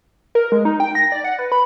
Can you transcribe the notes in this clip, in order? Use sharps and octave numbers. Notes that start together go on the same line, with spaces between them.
A#4
G#3
D#4
G5
A#6
D5
F#5
B4
B5